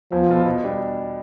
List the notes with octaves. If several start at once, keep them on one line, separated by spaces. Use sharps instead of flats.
E2 F3
B2 B3 F4 A4
B2
G3 D4